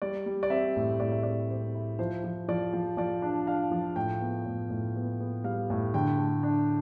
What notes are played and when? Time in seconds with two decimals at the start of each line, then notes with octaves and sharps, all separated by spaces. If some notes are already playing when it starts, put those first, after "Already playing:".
0.02 G3 D5
0.26 G3
0.43 D5
0.50 C4 E5
0.76 A2
1.00 A2 D5
1.12 E5
1.23 C4 D5
1.49 C4 C5
1.75 E4
1.99 F3 C5
2.24 F3
2.48 F3 D5
2.73 F3
2.97 F3 D5
3.22 D4
3.47 D4 F5
3.71 F3
3.96 A2 G5
4.21 B3
4.46 A2
4.70 A2
4.96 B3
5.20 B3
5.44 G3 F5
5.70 A2
5.94 D3 G5
6.18 A3
6.43 D4